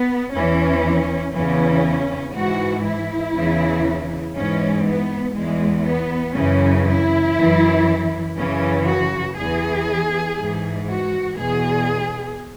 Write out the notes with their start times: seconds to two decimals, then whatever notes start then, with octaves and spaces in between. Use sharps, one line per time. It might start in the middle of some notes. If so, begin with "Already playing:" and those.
Already playing: B3
0.33 E2 E3 C#4
1.34 E2 C#3 E3 C#4
2.34 G#2 E3 F#4
2.85 E4
3.35 E2 C#3 E3
4.35 G#2 E3 C#4
4.86 B3
5.35 E2 E3 G#3
5.85 B3
6.36 F#2 C#3 E3 C#4
6.86 E4
7.37 F#2 E3
8.37 F#2 C#3 E3 C#4
8.87 F#4
9.37 E2 E3 G#4
10.38 G#2 E3
10.88 F#4
11.38 E2 B2 G#4